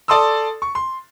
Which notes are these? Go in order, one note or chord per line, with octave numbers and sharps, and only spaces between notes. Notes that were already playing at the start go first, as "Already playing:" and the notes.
A4 D5 A5 C6 D#6 E6
C#6
C6